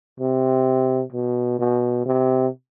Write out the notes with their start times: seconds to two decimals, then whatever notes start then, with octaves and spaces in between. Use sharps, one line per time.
0.20 C3
1.12 B2
1.59 B2
2.06 C3